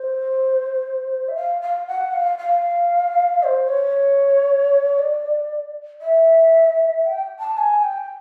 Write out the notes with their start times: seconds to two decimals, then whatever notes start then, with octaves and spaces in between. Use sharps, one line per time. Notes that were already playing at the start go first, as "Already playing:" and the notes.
Already playing: C5
1.28 E5
1.35 F5
1.61 F5
1.87 F#5
2.13 F5
2.38 F5
3.43 C5
3.68 C#5
4.98 D5
6.01 E5
7.05 G5
7.39 A5
7.57 G#5
7.83 G5